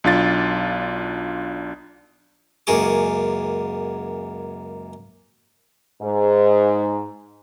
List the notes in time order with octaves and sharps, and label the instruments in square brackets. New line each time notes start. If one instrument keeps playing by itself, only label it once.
[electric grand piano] B1 D4 F4 A6
[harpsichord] C#2 F#2 A#3 F#4 G#4 D6
[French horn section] G#2